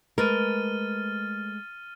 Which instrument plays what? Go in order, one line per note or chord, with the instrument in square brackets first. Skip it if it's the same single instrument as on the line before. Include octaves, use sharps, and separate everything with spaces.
[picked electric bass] G#3 A3 [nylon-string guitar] A#4 B4 [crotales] F6 A6 D#7